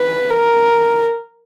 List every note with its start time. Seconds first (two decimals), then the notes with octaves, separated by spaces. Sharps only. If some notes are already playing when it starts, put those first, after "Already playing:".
Already playing: B4
0.30 A#4